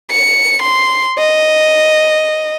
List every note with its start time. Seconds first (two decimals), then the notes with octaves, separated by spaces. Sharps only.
0.11 C#7
0.62 C6
1.19 D#5